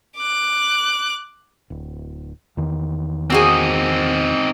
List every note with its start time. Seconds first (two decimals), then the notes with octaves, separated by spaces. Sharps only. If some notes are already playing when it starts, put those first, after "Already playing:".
0.17 D6 F#6
1.70 D1
2.57 E2 D#3
3.30 A#3 C4 D#4 F#4 G#4